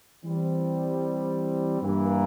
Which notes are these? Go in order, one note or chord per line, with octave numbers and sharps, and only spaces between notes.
E3 G3 C4
G2 E3 A#3